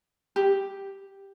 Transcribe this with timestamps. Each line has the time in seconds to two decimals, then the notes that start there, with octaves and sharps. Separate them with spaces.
0.36 G4